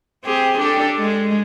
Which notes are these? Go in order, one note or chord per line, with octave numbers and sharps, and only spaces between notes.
C4 G4 G#4
D4 G4 A4
G#3